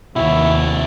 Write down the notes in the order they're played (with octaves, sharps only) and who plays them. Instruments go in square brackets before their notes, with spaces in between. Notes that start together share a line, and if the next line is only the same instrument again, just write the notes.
[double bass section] D#2 [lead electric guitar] C3 F#4 [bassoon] E4